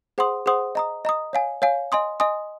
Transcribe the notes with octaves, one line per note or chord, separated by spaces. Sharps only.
G#4 C5 F#5 C6 D#6
G#4 C5 F#5 C6 D#6
D#5 A#5 D#6
D#5 A#5 D#6
C#5 F5 G#5
C#5 F5 G#5
D#5 G#5 C6 D#6
D#5 G#5 C6 D#6